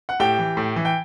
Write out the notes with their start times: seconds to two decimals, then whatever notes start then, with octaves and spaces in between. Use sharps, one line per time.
0.09 F#5
0.20 A2 G4 G5
0.39 E3
0.57 A2
0.76 E3
0.85 G5